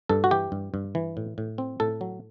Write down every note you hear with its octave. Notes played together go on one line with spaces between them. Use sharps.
G2 A4
F#4
E3 G4
G2
G2
E3
A2
A2
C4
A2 A4
F#3